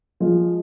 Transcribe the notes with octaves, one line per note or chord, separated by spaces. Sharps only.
F3 G#3